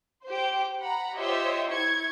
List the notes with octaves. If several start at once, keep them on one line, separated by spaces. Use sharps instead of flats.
G4 C5
F#5 A#5 B5
F4 G4 C5 C#5 D#5 E5
E4 C#6 G#6